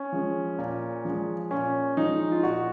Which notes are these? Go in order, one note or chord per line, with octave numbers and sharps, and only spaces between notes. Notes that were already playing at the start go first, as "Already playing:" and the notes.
Already playing: C#4
F3 G#3
A#2
F3 G#3
A#2 C#4
F3 G#3 D#4
F4
A#2 F#4